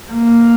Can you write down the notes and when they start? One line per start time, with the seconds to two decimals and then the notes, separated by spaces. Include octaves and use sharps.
0.11 A#3